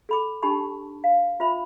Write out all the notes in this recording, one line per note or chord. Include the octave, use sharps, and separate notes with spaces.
A4 B5 D6
D4 D#4 G4 A5 B5 C#6
F5
F4 C5 E5 B5